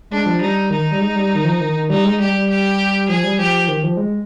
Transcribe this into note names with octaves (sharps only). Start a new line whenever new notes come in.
G#3 D4
F3
G3 D#4
D#3 D#4
G3
G#3
G3
D#3
F3
D#3
D#3
G3 D#4
G#3
G3 G4
G3
G4
F3 G#4
G3
F3 G4
F3
D#3
F3
G#3